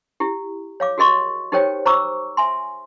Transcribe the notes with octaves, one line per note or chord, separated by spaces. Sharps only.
E4 G4
C#5 F5 D6
F#4 G#4 A#4 D#5 C6 C#6
D#4 G4 A#4 C5 C#5 G5
C5 A#5 C#6 D6 E6
E5 G#5 C6